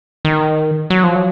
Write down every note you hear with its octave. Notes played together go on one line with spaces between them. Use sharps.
D#3
F#3
F3
F#3